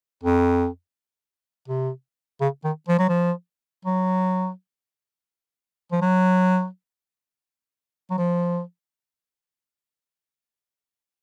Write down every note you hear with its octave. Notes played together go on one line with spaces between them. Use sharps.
F2
C3
C#3
D#3
F3
F#3
F3
F#3
F3
F#3
F#3
F3